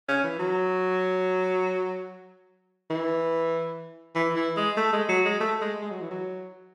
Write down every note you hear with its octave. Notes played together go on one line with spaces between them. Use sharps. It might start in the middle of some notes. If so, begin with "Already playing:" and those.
C#4
E3
F#3
E3
E3
E3
G#3
A3
G#3
F#3
G#3
A3
G#3
G#3
F#3
E3
F#3